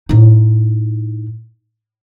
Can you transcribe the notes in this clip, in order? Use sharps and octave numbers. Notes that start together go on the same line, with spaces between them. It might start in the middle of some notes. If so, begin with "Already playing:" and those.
A2 D#4